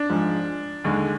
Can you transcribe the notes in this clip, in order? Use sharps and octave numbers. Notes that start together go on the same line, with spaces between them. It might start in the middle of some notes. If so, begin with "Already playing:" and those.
Already playing: D4
G#2 F3 G#3
D#2 D3 G#3